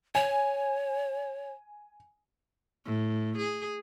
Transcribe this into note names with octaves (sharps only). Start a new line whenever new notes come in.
C#5 G#5
A2
G#4